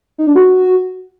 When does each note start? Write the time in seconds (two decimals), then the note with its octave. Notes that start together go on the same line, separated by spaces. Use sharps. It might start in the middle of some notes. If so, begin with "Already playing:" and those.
0.18 D#4
0.27 D4
0.35 F#4